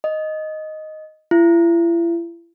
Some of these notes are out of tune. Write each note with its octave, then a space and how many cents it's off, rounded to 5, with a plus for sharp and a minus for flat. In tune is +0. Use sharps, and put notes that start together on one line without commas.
D#5 +0
E4 +40